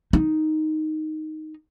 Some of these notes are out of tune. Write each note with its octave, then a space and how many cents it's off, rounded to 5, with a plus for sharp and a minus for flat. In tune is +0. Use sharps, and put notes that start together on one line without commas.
D#4 +0